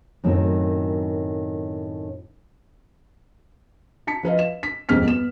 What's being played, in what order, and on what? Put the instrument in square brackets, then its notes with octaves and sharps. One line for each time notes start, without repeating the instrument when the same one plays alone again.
[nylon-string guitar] F#2 A2 D#3 F#3 C4
[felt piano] A5 B6 C#7
F3 B4 D#5 F5
E7
B6
D#1 F2 G#2 B2 F6 B6
B3 E7